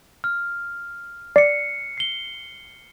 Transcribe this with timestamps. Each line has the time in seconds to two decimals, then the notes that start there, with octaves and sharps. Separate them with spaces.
0.24 F6
1.36 D5 C7 C#7
1.97 C7 G7